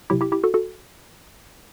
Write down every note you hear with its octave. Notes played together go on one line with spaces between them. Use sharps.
C3 F#3 E4 G4
E4 G4
E4 G4
F#4 A4
F#4 A4